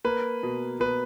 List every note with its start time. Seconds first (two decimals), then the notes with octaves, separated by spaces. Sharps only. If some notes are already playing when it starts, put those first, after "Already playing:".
0.04 A#3 B4
0.43 B2
0.80 B2 B4